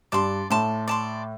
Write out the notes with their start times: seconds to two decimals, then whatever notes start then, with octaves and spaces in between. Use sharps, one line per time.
0.12 G2 D5 A5 C6
0.50 A2 D5 A5 C6
0.88 D5 A5 C6